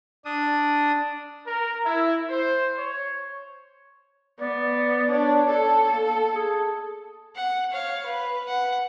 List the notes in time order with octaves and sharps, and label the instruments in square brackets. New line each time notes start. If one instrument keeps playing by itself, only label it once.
[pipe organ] D4 D#6
[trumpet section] A#4
E4
C5
C#5
[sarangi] B3 [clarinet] D5
[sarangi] D4 [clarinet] C#5
[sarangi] A4
[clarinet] A#3
G#4
[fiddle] F#5
C#5 F5
B4
F#5